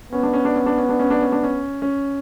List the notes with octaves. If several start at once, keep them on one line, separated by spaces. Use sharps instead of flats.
B3 C#4
D4
C#4
D4
C#4
D4
C#4
D4
C#4
D4
C#4
D4
C#4
C#4